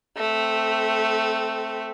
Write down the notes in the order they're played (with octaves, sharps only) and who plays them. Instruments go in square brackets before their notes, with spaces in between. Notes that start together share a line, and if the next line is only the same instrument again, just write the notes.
[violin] A3 C4